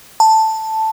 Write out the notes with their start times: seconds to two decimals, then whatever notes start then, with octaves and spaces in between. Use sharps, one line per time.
0.20 A5